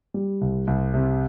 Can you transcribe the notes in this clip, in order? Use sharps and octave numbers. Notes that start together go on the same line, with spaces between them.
G3
C2
C2
C3